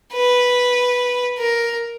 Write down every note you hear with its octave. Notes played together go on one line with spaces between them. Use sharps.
B4
A#4